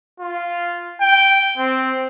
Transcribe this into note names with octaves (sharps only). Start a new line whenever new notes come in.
F4
G5
C4